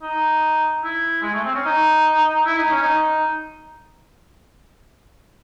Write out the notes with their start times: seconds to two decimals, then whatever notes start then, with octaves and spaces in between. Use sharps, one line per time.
0.03 D#4
0.84 E4
1.23 G#3
1.34 A3
1.44 C4
1.55 C#4
1.65 D#4
2.46 E4
2.58 D#4
2.70 C#4
2.82 D#4